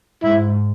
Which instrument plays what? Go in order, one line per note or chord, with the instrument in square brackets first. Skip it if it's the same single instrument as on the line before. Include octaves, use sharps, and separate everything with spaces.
[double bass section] G#2 [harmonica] E4